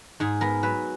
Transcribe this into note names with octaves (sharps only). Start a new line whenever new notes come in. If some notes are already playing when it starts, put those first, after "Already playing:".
G#2 G#4
B3 A#4
F#3 B4